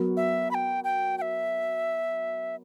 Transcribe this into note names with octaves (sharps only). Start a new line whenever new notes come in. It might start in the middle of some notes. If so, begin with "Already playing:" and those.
Already playing: F#3 B3 F#4 A#4
E5
B5
G5
G5
G5
E5